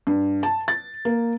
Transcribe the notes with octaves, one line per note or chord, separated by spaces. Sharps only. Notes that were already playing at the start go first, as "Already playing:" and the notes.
G2
A5
A6
A#3